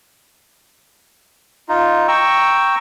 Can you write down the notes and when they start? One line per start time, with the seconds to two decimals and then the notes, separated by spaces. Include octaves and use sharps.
1.69 D#4 F4
2.08 G5 A#5 C#6 E6